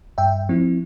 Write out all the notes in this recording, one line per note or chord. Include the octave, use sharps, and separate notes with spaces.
G2 E5 G5
F3 C4 E4